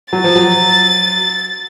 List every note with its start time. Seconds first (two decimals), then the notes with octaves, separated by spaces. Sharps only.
0.13 F#3 A6
0.24 F3
0.35 F#3